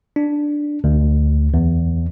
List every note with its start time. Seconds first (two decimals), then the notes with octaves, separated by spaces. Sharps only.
0.16 D4
0.84 D2
1.54 E2